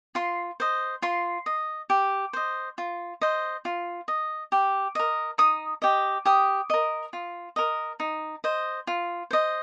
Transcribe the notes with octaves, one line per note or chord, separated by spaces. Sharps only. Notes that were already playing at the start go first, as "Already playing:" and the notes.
F4 C6
C5 D#5
F4 C6
D#5
G4
C5 D#5
F4
C5 D#5
F4
D#5
G4
A#4 D#5
D#4 D#6
G4 D#5
G4 D#6
A#4 D#5
F4
A#4 D#5
D#4
C5 D#5
F4
C5 D#5